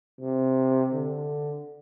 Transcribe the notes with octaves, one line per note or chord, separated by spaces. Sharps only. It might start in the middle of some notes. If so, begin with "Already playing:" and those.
C3
D3